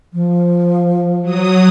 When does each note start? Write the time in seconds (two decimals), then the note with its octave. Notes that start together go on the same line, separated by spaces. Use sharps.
0.13 F3
1.22 F#3 D#6